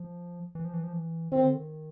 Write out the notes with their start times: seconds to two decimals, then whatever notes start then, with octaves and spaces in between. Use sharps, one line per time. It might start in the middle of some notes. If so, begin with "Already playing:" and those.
Already playing: F3
0.55 E3
0.65 F3
0.73 E3
0.84 F3
0.93 E3
1.32 D#3 C4
1.43 D3
1.53 D#3